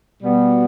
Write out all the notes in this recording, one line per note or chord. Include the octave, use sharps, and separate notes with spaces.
B2 G3 B3